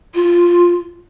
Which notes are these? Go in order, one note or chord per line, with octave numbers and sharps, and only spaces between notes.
F4